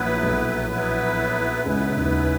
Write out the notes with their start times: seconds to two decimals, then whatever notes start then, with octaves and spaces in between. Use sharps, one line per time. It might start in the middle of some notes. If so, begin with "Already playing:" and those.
Already playing: A#1 A#2 F#3 B3 E4 B4
0.23 B1 B2
0.70 F#3 B3 E4 B4
1.65 C#2 C#3 F#3 B3 E4 B4
1.89 C#3
1.97 D#2 D#3